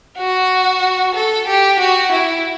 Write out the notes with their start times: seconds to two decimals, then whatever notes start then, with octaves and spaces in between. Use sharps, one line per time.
0.18 F#4
1.15 A4
1.47 G4
1.79 F#4
2.12 E4